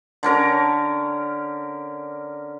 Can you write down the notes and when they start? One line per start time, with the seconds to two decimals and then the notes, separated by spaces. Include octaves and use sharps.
0.23 D3 C#4 A#4 A#5